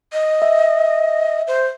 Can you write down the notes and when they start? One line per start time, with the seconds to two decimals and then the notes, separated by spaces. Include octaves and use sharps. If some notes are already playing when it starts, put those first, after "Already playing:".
0.12 D#5
0.42 E5
1.47 C5